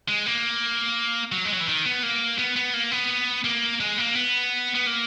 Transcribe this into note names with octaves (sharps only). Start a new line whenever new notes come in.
G#3
A#3
F#3
G#3
F#3
E3
D#3
B3
A#3
B3
B3
A#3
B3
A#3
G#3
A#3
B3
B3
A#3